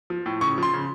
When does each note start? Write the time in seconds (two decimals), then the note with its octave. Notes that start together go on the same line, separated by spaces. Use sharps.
0.10 F3
0.26 A2
0.41 C#3 C#6
0.58 F3 C6
0.73 C#3